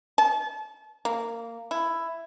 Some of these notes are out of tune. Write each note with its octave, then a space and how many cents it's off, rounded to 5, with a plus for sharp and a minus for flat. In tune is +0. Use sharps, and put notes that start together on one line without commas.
A5 -40
A#3 -15
E4 +10